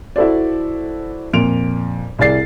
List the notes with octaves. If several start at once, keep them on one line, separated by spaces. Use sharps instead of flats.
E4 F#4 A4 C5 D5
F2 A#2 D7 F7
C2 E4 G#4 D5 A6 C7